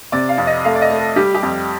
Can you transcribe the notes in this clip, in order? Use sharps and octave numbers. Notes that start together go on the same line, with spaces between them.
C3 D5
F5
F2
D#5
A3 F5
D5
D#5
A3
A4
G3 G4
G4
F2